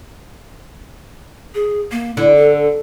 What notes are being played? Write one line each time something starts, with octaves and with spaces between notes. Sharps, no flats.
G#4
A#3
D3 E4
A4